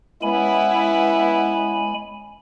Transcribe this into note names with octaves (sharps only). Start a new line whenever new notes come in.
G#3 B3 C#4 E4 G#5 B5